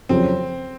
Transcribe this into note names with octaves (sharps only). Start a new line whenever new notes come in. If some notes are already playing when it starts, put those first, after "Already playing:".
F2 C#3 F#3 C4